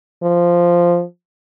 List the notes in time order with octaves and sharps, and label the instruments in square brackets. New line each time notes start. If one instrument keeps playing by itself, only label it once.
[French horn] F3